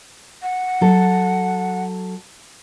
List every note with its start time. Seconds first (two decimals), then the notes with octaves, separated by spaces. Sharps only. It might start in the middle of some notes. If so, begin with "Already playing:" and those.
0.43 F#5
0.81 F#3 A4